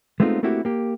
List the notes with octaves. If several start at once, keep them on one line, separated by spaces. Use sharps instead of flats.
G#3 A3 B3 C4 D#4 F4
A3 A#3 C4 E4 F#4 G4
A#3 G4